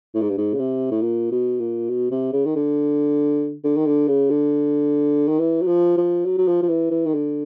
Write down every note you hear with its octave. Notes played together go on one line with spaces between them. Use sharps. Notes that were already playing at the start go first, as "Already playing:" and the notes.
A2
G#2
G2
G#2
C#3
C3
A2
A#2
B2
A#2
B2
C3
C#3
D#3
D3
D3
D#3
D3
C#3
D3
D#3
E3
F#3
F3
F3
F#3
F#3
F3
F3
E3
E3
D#3
D3